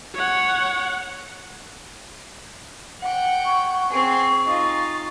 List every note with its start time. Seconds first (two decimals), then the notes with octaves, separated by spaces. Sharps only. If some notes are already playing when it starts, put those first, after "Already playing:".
0.15 C#5 F#5
3.01 F#5 G5
3.45 C#6
3.89 C4 G#4
4.47 D#4 F4 A6